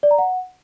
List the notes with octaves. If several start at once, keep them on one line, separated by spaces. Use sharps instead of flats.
D5
A#5
F#5